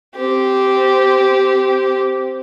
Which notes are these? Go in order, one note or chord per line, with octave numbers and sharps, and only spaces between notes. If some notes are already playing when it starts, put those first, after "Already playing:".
C4 G4